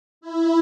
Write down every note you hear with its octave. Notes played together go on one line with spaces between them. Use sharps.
E4